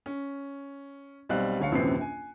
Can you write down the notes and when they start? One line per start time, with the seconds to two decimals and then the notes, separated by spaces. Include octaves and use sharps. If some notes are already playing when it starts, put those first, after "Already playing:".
0.06 C#4
1.29 B1 G3 C4 F5 F#6
1.59 D2 D3 C#5 F5 C#7
1.71 D#1 A#1 F#2 C3 E3 C7
2.01 G#5